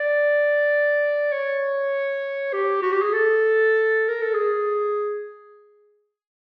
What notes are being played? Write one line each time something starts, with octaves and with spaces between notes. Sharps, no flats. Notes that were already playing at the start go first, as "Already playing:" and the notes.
Already playing: D5
C#5
G4
F#4
G4
G#4
A4
A#4
A4
G#4